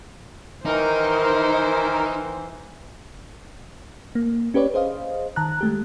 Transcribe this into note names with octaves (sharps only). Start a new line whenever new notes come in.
D#3 E3 D#4 A#4 C5
A#3
C#4 G4 B4 C#5 D5
G#4 C5 D#5 F5
D#3 A5 A#5 F#6
G#3 A3 G4